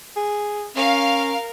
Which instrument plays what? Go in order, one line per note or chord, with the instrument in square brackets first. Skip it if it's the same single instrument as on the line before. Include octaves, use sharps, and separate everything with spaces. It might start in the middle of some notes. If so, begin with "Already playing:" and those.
[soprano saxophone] G#4
[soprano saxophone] C#4 [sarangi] A#4 [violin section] F5